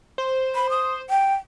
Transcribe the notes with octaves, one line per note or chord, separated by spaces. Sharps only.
C5
B5
D#6
G5